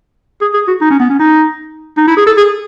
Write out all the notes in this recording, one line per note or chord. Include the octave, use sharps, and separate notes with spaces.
G#4
G#4
F#4
D#4
C#4
B3
C#4
D#4
D#4
E4
G#4
A4
G#4